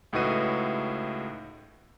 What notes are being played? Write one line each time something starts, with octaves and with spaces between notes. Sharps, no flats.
C#2 A2 D#4 F#4 B4 D#7